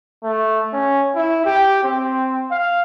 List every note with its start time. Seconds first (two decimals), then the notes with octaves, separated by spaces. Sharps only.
0.24 A3
0.73 C#4
1.16 E4
1.45 G4
1.83 C4
2.51 F5